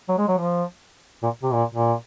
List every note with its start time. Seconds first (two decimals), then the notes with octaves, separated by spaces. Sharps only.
0.09 F#3
0.18 G#3
0.28 F#3
0.37 F3
1.23 A#2
1.43 C3
1.53 A#2
1.74 A#2